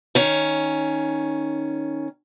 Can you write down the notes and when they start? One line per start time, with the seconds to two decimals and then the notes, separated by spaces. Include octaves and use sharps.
0.15 D#3 C#4